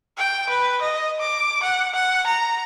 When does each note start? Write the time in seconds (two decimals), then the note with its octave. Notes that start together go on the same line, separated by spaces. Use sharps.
0.17 G5
0.49 B4
0.82 D#5
1.20 D6
1.63 F#5
1.94 F#5
2.27 A#5